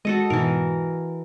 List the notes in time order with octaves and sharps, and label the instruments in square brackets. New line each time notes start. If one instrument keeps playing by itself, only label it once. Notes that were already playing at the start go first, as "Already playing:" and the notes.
[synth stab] G#3 [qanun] F#4 A4 D#5
[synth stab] G#2 B2 [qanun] E3 A#4